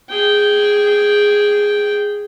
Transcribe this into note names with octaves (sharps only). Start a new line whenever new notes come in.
G#4 G5